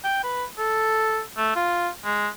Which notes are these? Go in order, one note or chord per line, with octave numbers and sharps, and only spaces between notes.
G5
B4
A4
A3
F4
G#3